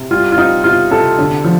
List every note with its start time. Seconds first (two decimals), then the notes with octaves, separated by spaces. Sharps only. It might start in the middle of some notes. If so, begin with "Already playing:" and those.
Already playing: C3
0.11 G3 F4
0.32 F4
0.38 C4 D#4
0.64 C3 F4
0.91 C3 A4
1.18 D3
1.44 F3